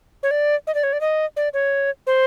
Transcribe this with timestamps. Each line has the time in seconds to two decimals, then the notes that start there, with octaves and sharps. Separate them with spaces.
0.23 C#5
0.31 D5
0.67 D#5
0.75 D5
0.83 C#5
0.93 D5
1.01 D#5
1.37 D5
1.54 C#5
2.07 C5